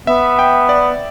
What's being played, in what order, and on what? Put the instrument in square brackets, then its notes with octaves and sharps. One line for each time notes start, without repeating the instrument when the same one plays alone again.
[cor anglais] B3 [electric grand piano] E5
[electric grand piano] G5
D5